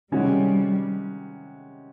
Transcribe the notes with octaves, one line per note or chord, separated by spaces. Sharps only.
C3 D#3 G3 G#3 C#4 F#4